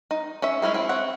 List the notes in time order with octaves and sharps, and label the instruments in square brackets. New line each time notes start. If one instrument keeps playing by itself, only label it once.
[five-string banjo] D#4
C#4 C#5 E5
G#3 C#4 E4 G#4
C4 E4
C4 C#5 F#5